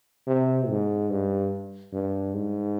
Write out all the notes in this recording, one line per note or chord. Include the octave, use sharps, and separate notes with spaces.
C3
G#2
G2
G2
G#2